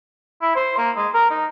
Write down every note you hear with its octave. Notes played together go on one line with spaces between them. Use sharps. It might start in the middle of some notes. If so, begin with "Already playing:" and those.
E4
C5
A#3
G#3
A#4
D#4